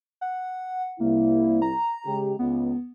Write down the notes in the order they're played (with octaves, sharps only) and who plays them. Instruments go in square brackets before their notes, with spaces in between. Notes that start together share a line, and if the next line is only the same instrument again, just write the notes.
[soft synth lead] F#5
[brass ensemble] C2 E4 [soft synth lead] A#3
[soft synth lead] A#5
[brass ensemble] C#3 G#3 G4
[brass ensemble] C#2 [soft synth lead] B3